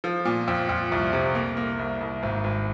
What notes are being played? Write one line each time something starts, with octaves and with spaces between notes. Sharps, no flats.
F3
A#2
F2
F2
C2
C3
A#3
A#3
C2
C2
G#1
G#1